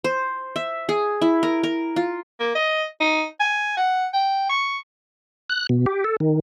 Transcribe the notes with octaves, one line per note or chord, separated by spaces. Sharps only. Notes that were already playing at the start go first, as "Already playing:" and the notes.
C5
E5
G#4
E4
A#4
A#4
F4
A#3
D#5
D#4
G#5
F#5
G5
C#6
F#6
B2
G4
A4
D#3